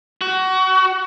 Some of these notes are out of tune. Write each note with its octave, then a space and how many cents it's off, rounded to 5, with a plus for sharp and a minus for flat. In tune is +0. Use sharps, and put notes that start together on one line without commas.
F#4 +25